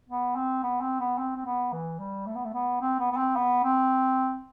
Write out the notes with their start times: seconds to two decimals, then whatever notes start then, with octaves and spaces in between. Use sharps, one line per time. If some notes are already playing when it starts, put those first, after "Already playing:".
0.09 B3
0.36 C4
0.63 B3
0.81 C4
1.00 B3
1.18 C4
1.36 C4
1.45 B3
1.72 E3
1.99 G3
2.26 A3
2.35 B3
2.45 A3
2.54 B3
2.81 C4
2.99 B3
3.12 B3
3.17 C4
3.36 B3
3.63 C4